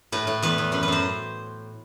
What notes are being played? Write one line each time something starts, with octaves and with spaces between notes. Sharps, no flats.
A2 B4
A2
E2 B4
E2
F#2 B4
B4
F#2 C5